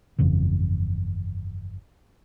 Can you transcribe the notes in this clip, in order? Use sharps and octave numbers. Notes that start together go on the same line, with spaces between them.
G1 F2 C#3 E3